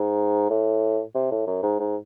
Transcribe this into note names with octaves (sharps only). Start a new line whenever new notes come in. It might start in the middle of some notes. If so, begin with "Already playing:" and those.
Already playing: G#2
A2
C3
A2
F#2
G#2
G#2